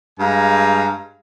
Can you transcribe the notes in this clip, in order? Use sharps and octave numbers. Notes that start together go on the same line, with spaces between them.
G2 G#3 F5 G#5 A#5